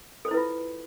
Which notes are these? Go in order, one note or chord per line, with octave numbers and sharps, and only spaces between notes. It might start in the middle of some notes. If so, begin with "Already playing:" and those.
E4 F4 A4 B4 C5